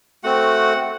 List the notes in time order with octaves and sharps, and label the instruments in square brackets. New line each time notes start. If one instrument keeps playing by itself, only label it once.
[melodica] A3 C4 F#4 F#5